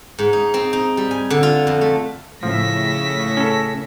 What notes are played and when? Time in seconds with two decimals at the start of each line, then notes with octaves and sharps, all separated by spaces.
0.19 G#2
0.33 D#4
0.54 C4
0.73 D#4
0.97 G3
1.11 G#5
1.30 D3
1.43 F4
1.67 F2
1.81 A3
2.43 A2 C#3 F3 E5 A#6 B6
3.37 C#4 A4